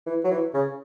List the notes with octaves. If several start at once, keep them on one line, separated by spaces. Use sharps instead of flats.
E3
F#3
E3
C#3